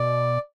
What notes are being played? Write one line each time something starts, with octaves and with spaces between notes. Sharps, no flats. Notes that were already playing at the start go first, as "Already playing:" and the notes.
Already playing: B2 D5